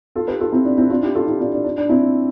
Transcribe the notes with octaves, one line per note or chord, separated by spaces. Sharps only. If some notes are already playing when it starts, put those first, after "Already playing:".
F4 A4
G4 B4
F4 A4
C4 E4
D4
C4 E4
D4 F4
E4 G4
F4 A4
E4 G4
D4 F4
D4
D4
D4
C4 E4